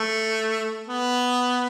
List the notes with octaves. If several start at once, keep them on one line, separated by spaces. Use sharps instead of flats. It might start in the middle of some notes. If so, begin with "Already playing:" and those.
Already playing: A3
B3